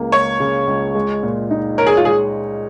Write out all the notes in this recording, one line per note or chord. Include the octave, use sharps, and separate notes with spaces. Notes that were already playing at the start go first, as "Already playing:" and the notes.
Already playing: C#2 C#3 A#3
C#2 C#5
C#3
C#2
G#3
A#2
D#4
A#4 C#5
G#4
F4
G#3 G#4